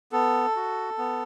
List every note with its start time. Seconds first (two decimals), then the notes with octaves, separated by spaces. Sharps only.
0.12 B3 A4
0.56 F#4
0.98 B3